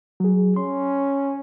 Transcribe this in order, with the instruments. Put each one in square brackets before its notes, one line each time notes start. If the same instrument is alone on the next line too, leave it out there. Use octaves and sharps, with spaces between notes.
[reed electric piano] F#3 G#4
[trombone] C#4 [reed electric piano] C6